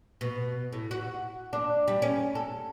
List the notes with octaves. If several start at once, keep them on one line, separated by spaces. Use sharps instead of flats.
B2
A2
F#4
D4
G3
C#4
A4